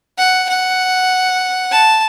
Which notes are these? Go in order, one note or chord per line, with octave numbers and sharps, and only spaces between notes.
F#5
F#5
A5